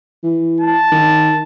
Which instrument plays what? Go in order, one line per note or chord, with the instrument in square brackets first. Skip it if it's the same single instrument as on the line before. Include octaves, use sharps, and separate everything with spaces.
[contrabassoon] E3
[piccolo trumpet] A5
[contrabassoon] D#3